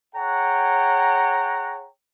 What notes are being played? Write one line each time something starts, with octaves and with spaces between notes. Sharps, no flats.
G#4 C#5 F#5 G5 A#5